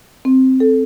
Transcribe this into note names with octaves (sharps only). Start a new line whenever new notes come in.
C4
A4